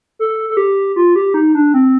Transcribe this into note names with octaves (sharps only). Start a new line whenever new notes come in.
A4
A4
G4
F4
G4
D#4
D4
C4